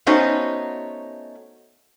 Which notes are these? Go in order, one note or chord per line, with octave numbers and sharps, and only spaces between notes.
A3 B3 C#4 D#4 F#4 C5